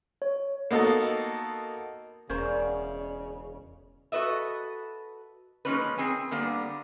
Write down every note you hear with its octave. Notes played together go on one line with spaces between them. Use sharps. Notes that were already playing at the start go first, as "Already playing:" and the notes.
C#5
A#3 B3 D#4 F#4 A4
E1 C#3 C#4 A#4 C5 D5 F5
F#4 A4 B4 D#5 E5
F3 G#3 A#3 C#4 D#4 B4
C4 G#4 G#5
D3 G3 A#3 B3